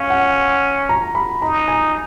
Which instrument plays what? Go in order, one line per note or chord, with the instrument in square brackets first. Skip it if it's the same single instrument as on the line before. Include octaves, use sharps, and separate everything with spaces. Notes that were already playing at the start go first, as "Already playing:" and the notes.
Already playing: [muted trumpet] C#4 [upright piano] F5
[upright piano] F#5
A#5
B5
[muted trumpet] D#4 [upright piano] A#5
[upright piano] G#5